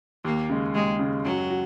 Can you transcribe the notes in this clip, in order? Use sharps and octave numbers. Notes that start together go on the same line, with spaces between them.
D#2 A#3
C#3 G#3
D#2 G#3
C#3 G#3
F#2 F#3
F#4